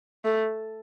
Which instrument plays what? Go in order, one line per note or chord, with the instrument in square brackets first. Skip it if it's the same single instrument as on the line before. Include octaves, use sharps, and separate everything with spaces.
[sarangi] A3